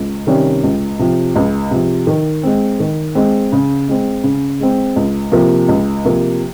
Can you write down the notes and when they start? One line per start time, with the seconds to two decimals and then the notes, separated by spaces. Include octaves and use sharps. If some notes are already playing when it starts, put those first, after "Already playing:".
Already playing: C#2
0.27 C3 D#3 G3 C#4
0.63 C#2
0.99 C3 F3
1.36 C#2
1.71 C3 F3
2.07 D#3
2.43 G#3 C4
2.80 D#3
3.15 G#3 C4
3.52 C#3
3.88 G#3 C4
4.23 C#3
4.60 G#3 C4
4.96 C#2
5.32 C3 F3 A#3
5.68 C#2
6.05 C3 F3 A#3